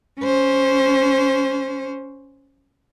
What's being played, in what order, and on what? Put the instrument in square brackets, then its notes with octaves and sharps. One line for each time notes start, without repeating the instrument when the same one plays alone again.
[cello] C#4 C5